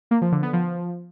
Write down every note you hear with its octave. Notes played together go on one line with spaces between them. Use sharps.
A#3
F3
D3
B3
F3